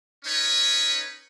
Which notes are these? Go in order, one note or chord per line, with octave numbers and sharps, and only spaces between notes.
C#4 D#4 B4 C#5